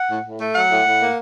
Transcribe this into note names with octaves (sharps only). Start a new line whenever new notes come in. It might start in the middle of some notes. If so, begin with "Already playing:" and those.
Already playing: F#5
A2
A2
A3
F#3 F#5
A2
A2
A#3